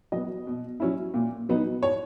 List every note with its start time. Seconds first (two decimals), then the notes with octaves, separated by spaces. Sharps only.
0.12 F#3 B3 D#5
0.47 B2
0.80 F#3 C#4 E4
1.14 A#2
1.49 F#3 B3 D#4
1.83 C#5